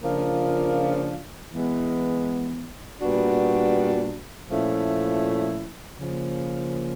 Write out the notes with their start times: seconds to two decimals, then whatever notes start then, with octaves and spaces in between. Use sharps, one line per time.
0.02 C#3 F3 A#3 D4 F4
1.51 E3 G#3 B3
3.00 A#2 G3 B3 D4 F#4
4.49 A#2 F3 A3 C#4 E4
5.98 C#3 F3 A#3